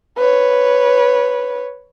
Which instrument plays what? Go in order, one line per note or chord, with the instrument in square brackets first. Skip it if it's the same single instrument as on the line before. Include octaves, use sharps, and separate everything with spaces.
[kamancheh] B4 C#5